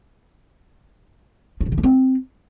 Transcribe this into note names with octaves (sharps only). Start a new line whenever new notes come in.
D4
B2
D#3
A#3
C4